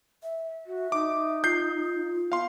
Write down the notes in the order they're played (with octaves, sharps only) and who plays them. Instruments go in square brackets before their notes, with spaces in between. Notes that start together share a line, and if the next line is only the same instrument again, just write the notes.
[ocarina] E5
[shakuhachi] F#4
[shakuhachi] D#4 [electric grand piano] D6
[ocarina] F4 [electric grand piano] G6 C7
[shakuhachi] B3 [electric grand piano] F5 C6